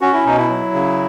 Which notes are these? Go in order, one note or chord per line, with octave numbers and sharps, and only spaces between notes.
C#4 F#4
E4
B2 D#4
E4
F#3
C#3